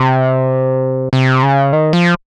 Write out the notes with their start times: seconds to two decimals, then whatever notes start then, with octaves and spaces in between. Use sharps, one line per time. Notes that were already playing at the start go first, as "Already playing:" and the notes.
Already playing: C3
1.13 C3
1.43 C#3
1.73 D#3
1.93 F3